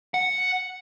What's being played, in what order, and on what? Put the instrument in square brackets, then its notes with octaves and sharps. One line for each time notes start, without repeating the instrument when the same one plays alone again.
[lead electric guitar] F#5